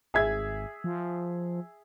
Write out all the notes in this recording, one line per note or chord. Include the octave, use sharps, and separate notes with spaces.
G#1 G#4 E5 G#6
F3